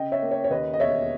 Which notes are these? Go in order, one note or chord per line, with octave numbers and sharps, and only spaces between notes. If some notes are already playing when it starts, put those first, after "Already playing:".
Already playing: C#3 D#5 G5
C#5 E5
A#3
C#5
C#5
D#2 B4 D#5
D#5
E1 C#5 E5